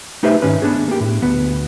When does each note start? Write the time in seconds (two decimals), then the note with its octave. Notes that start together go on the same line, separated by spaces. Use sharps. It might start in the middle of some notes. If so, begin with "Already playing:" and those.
0.23 A3 D#4 G4 B4 C5 E5
0.42 G#2 D#3 C#4 B4
0.62 B3 D4 G#4
0.88 A#3 G4
1.01 A2
1.22 D2 B3